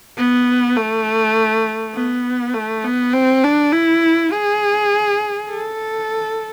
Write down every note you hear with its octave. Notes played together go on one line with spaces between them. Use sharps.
B3
A3
B3
A3
B3
C4
D4
E4
G#4
A4